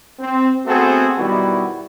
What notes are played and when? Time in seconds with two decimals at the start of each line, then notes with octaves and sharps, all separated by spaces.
0.19 C4
0.66 A3 B3 C4 F#4 G#4 A4
1.16 B1 D#3 G3 B3 E4 F#4